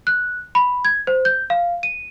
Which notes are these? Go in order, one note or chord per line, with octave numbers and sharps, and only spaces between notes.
F#6
B5
G#6
C5
G6
F5
D#7